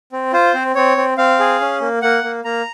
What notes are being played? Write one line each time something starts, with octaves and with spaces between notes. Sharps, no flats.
C4
F4 C5
C4
C4 C#5
C4
C4 F5
G#4
C#4
A#3
A#3 F#5
A#3
A#3 A#5